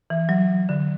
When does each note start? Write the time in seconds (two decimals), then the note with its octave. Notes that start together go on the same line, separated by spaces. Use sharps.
0.10 E3
0.29 F#3
0.69 D3